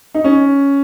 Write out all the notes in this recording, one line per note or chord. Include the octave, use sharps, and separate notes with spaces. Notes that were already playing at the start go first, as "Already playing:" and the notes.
D#4
C#4